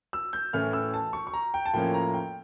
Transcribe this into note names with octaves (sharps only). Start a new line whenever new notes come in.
E6
G6
A2 E3 A3 C#4 F6
E6
A5
C#6
C#6
A#5
G5
A5
A2 F3 A#3 C#4 G5
A#5
G5